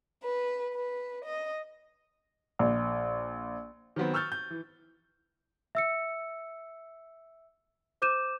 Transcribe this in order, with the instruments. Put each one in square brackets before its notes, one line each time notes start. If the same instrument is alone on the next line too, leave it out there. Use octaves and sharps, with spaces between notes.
[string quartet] B4
B4
D#5
[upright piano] A#1
D#3 F#3 B3 C4
C#6 E6 F6 G6 A6
G6
E3
[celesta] E5 E6 C#7
C5 D6 G6 D#7 E7